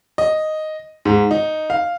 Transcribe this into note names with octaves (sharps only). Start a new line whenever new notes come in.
D#5
G#2
D#4
F5